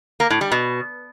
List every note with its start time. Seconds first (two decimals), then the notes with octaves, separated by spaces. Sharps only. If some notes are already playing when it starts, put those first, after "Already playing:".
0.20 A#3
0.30 A2
0.41 G3
0.52 B2